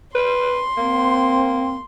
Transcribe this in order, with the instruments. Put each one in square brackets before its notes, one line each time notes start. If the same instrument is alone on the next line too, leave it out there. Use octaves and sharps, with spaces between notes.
[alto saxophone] B4 [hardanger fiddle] C6
[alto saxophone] A#3 [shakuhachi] C4